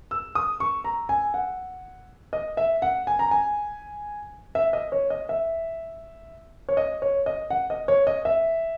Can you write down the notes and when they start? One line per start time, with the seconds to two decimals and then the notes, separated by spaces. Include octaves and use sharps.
0.11 E6
0.35 D#6
0.60 C#6
0.84 A#5
1.09 G#5
1.34 F#5
2.33 D#5
2.57 E5
2.82 F#5
3.07 G#5
3.19 A#5
3.31 G#5
4.55 E5
4.73 D#5
4.92 C#5
5.10 D#5
5.29 E5
6.69 C#5
6.77 D#5
7.02 C#5
7.26 D#5
7.50 F#5
7.70 D#5
7.88 C#5
8.07 D#5
8.25 E5